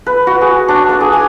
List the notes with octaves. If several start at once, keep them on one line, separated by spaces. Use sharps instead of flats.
B4
F#4
G#4
D4
D6
G#4
G#5